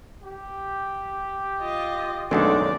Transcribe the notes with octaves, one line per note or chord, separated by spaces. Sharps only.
G4
F4 D#5
B1 F#2 D#3 G#3 A3 D4 A#4 D5